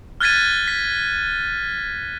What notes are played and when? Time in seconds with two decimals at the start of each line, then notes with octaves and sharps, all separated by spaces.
0.21 F6 F#6 G#6 A6 B6 D#7
0.68 B6